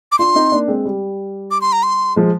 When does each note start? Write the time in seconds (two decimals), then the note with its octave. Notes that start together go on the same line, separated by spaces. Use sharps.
0.12 D6
0.19 D4 F4 C6
0.35 C4 D#4
0.52 A#3 D4
0.68 G#3 C4
0.86 G3
1.51 D6
1.61 C6
1.72 A#5
1.83 C6
2.16 F3 G#3